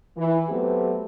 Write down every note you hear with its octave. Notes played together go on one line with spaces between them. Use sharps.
E3
F#3 A3 B3 C4 G4 B4